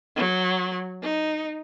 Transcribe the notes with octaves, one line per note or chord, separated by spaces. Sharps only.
F#3
D#4